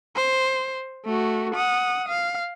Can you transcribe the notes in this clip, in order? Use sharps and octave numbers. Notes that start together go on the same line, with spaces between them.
C5
A3 F#4
F#5 D#6
F5